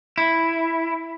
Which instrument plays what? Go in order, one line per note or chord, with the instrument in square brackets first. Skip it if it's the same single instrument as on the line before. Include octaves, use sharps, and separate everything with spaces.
[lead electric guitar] E4